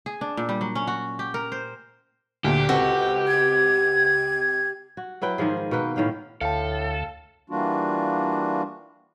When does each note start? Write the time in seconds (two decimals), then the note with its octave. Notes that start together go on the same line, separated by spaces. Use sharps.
0.06 G#4
0.21 D4
0.37 A#2
0.49 G3
0.61 F#3
0.75 C#4
0.87 F#4
1.19 G4
1.34 A#4
1.52 C5
2.44 D2 A#2 G4
2.69 C#2 C4 F#4 A4 B4
3.28 G#6
4.97 F#4
5.22 F#3 E4 B4 G5
5.38 G#2 D#3 F3 G#4
5.57 D#5
5.71 B2 A#3 B4 G5
5.96 A2 D#3 F5 G5
6.41 D2 A2 A4 F5 G5 A5
7.50 E3 G3 A#3 D4 F4 F#4